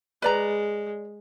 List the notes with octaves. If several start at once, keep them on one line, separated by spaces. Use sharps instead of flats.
G#3 B4 D5 A#5